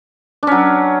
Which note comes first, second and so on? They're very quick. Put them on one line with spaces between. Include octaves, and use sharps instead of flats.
D4 C#4 F#3